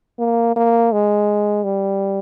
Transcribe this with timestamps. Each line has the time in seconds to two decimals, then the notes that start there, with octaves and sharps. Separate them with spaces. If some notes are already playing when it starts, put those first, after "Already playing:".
0.19 A#3
0.56 A#3
0.92 G#3
1.64 G3